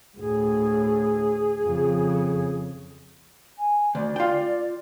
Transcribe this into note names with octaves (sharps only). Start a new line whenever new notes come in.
D2 A2 G#4
F2 C#3
G#5
D2 D5
F4 G5